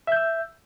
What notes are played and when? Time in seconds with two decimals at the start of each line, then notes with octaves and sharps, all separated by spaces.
0.07 E5
0.12 G6
0.16 E6